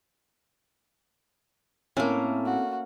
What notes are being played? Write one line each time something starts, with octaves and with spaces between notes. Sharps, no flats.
A2 A#3 C4 C#4
F#4